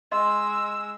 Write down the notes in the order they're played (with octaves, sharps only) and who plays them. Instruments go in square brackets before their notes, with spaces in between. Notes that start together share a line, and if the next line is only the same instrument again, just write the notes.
[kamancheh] G#3 E6 [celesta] D#5 C6